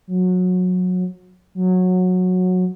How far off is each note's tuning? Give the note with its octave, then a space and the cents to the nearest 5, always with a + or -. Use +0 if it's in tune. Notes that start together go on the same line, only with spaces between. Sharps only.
F#3 -25
F#3 -15